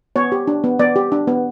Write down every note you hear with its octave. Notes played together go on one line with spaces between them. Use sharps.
B3 C#5
G4
D4
B3
B3 D5
G4
D4
B3